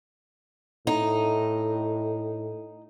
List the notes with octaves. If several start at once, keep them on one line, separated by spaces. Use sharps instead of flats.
A2 D#4